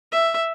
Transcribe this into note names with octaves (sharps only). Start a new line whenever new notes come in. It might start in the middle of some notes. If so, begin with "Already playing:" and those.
E5